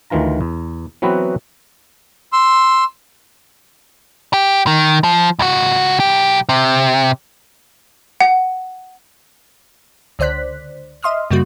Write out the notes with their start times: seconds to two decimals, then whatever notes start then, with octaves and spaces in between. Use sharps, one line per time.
0.10 D2 D#3 E3 F4 A#5
0.41 E2
1.02 E3 F#3 B3 C4 F#4 B4
2.33 C6 E6
4.33 G4
4.67 D#3
5.04 F3
5.39 C#2 F#4
6.00 B1 G4
6.49 C3
8.21 F#5
10.19 C#2 D3 C5 D5 F#6 B6
11.03 D#5 E5 C6 D#6 F6
11.31 F#2 C#3 G3 A#3 F#4